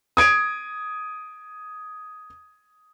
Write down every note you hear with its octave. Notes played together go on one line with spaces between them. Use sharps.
D#6 G#6 D7